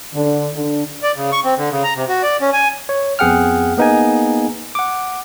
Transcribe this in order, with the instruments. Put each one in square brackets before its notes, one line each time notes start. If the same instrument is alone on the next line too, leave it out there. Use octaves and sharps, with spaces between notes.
[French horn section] D3
D3
[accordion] D5
C#3
C#6
C4
D3
C#3
A#5
C3
F#4
D5
C#4
G#5
[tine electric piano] C#5
F2 B3 G#4 F#5 G5 F6
A#3 B3 D#4 G#4 G#5
F#5 D6